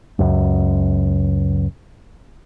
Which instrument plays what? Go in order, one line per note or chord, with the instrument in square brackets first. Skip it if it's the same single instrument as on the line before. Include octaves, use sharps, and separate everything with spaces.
[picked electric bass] C#2 F#2